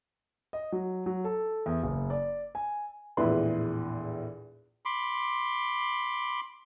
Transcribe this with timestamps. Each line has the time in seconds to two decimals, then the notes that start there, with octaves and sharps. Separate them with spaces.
0.53 D#5
0.72 F#3
1.06 F#3
1.24 A4
1.66 E2
1.83 F#1
2.10 D5
2.55 G#5
3.17 A#1 E2 A2 E4 B4 C6
4.85 B5 C6 D6